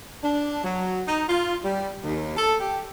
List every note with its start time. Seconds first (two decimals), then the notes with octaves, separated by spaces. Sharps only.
0.22 D4
0.64 F#3
1.07 D#4
1.28 F4
1.63 G3
2.04 D#2
2.36 A4
2.59 G4